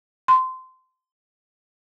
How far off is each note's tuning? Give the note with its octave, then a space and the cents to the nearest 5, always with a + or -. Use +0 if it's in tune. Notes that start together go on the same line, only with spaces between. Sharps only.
C6 -20